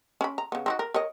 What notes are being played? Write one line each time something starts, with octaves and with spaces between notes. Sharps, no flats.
C#4 B5
A#5
C#3 B3
C4 D#4 F#4
A#4
A#4 C#5 D#5